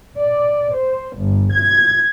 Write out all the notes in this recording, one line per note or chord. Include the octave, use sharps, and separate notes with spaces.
D5
C5
G1
G#6